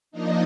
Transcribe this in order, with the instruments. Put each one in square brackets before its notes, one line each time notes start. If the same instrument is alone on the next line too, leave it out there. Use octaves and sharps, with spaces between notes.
[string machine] F3 A#3 D4 D#4 D#5